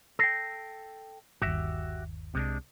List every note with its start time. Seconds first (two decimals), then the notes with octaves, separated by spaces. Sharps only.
0.19 A4 G5 E6 A#6 C7
1.42 G1 D#2 F#4 G4 E5
2.35 C2 C3 G#3 D4